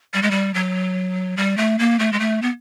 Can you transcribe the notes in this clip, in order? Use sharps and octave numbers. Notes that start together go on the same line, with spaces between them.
G3
G#3
G3
F#3
G3
A3
A#3
A3
G#3
A3
B3